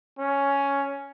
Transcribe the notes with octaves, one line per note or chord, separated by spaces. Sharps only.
C#4